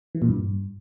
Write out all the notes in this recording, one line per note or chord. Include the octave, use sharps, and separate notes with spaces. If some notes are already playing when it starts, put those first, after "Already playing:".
E3
A#2
G2